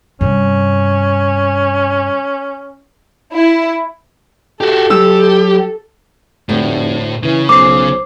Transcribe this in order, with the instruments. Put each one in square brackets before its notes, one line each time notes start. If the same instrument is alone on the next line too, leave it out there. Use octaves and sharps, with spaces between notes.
[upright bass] G2 C3 [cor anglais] C#4
[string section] E4
[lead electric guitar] F#4 G4 [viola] A4
[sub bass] F#3 [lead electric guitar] G4 [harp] E6
[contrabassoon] F1 [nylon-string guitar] D2 [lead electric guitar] A2
[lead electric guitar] C#3 [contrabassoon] E3
[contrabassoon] B1 [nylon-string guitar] C5 [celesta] D6 C7